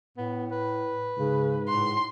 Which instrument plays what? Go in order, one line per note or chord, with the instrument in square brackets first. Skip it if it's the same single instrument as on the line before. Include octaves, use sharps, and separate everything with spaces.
[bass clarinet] A2 [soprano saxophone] B3
[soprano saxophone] B4
[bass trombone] G#2 [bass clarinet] C#3
[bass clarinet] A2 [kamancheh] C6